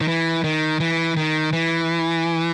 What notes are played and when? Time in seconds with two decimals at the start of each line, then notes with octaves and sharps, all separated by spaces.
0.01 D#3
0.08 E3
0.44 D#3
0.80 E3
1.17 D#3
1.53 E3